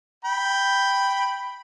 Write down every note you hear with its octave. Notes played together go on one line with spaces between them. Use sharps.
G5 B5